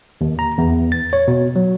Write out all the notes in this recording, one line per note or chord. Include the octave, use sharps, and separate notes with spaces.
D#2
A#5
E2
A6
C#5
B2
F#3